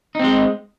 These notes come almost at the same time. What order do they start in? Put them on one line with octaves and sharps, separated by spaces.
D#4 C4 G#3